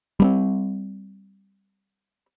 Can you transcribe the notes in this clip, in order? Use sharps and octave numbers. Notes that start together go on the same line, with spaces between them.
G3 B3 C4